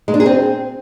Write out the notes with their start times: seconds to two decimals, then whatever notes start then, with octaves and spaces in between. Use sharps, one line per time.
0.08 G#3
0.14 D4
0.20 G#4
0.26 C4